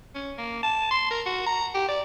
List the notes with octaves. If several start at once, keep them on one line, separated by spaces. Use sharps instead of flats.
C#4
A#3
A5
C6
A#4
F#4
A#5
G4
D5